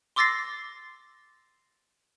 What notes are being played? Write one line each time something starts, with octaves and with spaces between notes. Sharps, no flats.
C6 D6 E6 A6 A#6 C7